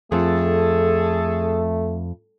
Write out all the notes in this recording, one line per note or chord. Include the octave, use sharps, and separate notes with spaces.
F2 A3 G#4 A4